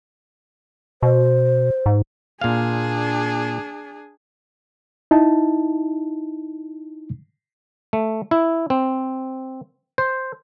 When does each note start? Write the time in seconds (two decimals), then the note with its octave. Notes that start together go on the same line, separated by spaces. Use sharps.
1.03 B2 C5
1.86 G#2
2.41 A#2 D4 G#4 F5
5.11 D#4 E4 A5
7.93 A3
8.31 E4
8.70 C4
9.98 C5